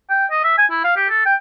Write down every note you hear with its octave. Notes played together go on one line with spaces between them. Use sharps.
G5
D#5
E5
G#5
E4
F5
G4
A4
G5